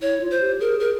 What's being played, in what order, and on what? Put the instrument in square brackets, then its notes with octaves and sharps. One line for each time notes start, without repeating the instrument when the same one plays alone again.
[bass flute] E4 [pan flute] C#5
[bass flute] F4
[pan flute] C5
[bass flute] G4
[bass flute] G#4 [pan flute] A#4
[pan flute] A#4